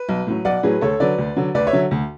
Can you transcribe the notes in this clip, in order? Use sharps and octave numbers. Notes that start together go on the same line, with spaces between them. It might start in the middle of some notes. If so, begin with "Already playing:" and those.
Already playing: B4
B1
A2 F#3
B1 D5 F#5
A2 F#3 G#4 B4
D2 A4 C#5
D3 F#3 B4 D5
D2
D3 F#3
D2 B4 D5
C#5 E5
D3 F#3
D2